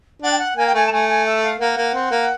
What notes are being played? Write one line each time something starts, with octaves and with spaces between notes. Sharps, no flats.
D4 F#5
G5
F#5
A#3 G#5
G5
A3 G#5
A5
A3 G#5
G#5
E5
F5
A#3 F#5
A#3
C4
A#3